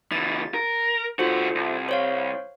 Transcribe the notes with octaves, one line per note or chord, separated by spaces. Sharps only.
C#2 E3 A6
A#4
C#2 F4 F#4 A4 C5
C2
C5 C#5 F5